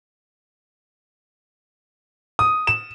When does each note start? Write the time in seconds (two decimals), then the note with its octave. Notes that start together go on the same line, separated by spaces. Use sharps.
2.39 D#6
2.67 E7